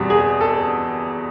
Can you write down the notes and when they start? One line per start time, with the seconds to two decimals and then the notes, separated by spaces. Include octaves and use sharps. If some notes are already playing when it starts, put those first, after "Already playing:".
Already playing: E2 B2 G3 C4
0.10 G#4
0.41 A4